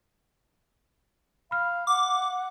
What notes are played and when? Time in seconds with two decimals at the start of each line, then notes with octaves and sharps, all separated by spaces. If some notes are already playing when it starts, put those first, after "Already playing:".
1.51 F5 B5 F6
1.87 F#5 D6